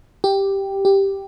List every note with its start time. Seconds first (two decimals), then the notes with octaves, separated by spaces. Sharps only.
0.24 G4
0.85 G4